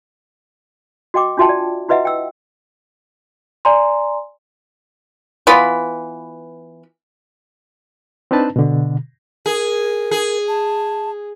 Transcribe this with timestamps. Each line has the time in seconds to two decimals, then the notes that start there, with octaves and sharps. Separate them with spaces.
1.14 F#4 D#5 G5 D6
1.37 D4 F4 F#4 E5 G5 A5
1.49 D5
1.88 E4 F#4 B4 D#5 E5 F#5
2.05 G5 E6
3.65 D5 G#5 A#5 C6
5.47 E3 B3 F4 B5
8.31 C4 D4 D#4 B4 A5
8.56 B2 D3
9.46 G#4 A#4
10.11 G#4
10.48 A5